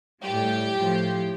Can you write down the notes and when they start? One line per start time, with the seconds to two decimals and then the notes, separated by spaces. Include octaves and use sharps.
0.23 A2 G3 G4
0.76 A2 F3